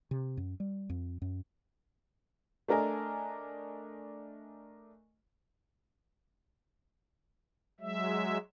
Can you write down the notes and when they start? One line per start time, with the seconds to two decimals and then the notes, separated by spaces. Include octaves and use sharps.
0.11 C3
0.37 F#2
0.60 G3
0.90 F2
1.22 F#2
2.68 A3 D4 A#4 D#5 G#5
7.80 F#3 G#3 E5